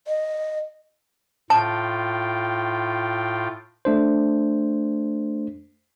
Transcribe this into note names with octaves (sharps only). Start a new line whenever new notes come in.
D#5
A2 F4 G5 A5
A3 D4 C5